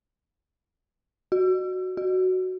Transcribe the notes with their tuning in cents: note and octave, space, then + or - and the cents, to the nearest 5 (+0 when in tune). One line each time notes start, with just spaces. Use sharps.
F#4 +0
F#4 +5